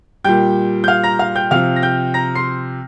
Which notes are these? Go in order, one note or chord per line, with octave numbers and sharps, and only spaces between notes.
A#2 G3 G5 G6
G6
F5 F6
A#5 A#6
F5 F6
G5 G6
C3 F3 F5 F6
A#6
G5 G6
A#5 A#6
C6 C7